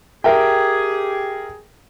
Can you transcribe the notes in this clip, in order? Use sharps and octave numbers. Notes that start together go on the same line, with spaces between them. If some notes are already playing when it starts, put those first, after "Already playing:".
G4 G#4 A#4 E5 G5